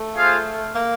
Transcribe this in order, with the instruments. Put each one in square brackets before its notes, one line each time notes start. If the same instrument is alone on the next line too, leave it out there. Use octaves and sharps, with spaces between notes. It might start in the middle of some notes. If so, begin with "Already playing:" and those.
Already playing: [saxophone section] A3
[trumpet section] F4 G#4 C5 F5
[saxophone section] A#3